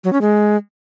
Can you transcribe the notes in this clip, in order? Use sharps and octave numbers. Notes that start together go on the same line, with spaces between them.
F#3
C#4
G#3